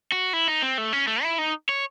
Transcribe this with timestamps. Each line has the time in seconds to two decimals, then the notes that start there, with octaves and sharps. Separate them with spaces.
0.12 F#4
0.33 E4
0.48 D#4
0.62 C4
0.78 A3
0.93 C#4
1.08 A3
1.23 E4
1.38 D#4
1.69 C#5